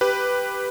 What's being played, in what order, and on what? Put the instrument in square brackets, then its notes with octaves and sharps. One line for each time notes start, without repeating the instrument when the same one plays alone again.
[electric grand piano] G4 B4